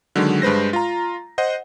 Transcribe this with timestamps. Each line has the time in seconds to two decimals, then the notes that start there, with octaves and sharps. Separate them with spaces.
0.16 D3 D#3 F#3 G#3
0.42 G2 G#3 B4 C5 A#6
0.73 F4 A#5
1.38 C5 D#5 F#5